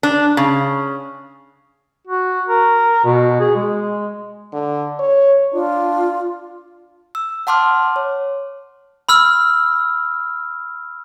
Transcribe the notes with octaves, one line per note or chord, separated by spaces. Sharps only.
D4
C#3
F#4
A#4
B2
G#4
G#3
D3
C#5
D4 F4
E6
F#5 A5 C6 D6 F6
C#5
B5 E6 F6